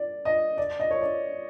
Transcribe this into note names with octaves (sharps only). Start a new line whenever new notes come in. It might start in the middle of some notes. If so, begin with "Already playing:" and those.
Already playing: D5
D#5
D5
D#5
C#5
D5